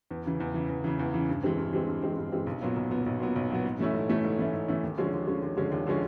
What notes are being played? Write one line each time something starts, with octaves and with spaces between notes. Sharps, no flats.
E2
C#3 E3
E2
C#3 E3
E2
C#3 E3
E2
C#3 E3
G2
E3 G#3 C4
G2
E3 G#3 C4
G2
E3 G#3 C4
G2
E3 G#3 C4
B1
A#2 F#3 B3
B1
A#2 F#3 B3
B1
A#2 F#3 B3
B1
A#2 F#3 B3
G#2
E3 A3 C#4 E4
G#2
E3 A3 C#4 E4
G#2
E3 A3 C#4 E4
G#2
E3 A3 C#4 E4
D#2
D3 F3 G#3 C#4
D#2
D3 F3 G#3 C#4
D#2
D3 F3 G#3 C#4
D#2
D3 F3 G#3 C#4